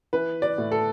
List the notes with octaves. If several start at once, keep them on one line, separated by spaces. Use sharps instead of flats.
E3 B4
D5
A2
A4